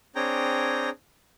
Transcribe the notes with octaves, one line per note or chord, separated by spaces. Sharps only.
C4 D4 G#4 C#5 G5 A#5